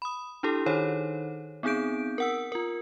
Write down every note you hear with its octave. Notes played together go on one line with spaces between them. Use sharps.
B5 D#6
D4 E4 G4 A4
D#3 D#4 A4 C5 C#5
B3 C4 D#4 G#4 G6 D7
A#4 F#5 E6
F4 A#4